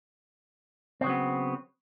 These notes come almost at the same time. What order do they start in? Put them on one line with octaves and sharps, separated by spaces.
C4 C#3 F#3 B3